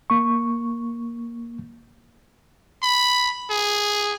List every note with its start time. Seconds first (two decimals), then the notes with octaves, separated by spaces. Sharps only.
0.10 A#3 C#6
2.83 B5
3.50 G#4